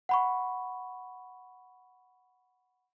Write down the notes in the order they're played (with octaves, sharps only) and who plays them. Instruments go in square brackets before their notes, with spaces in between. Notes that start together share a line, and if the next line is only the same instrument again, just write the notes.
[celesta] F#5 B5 C#6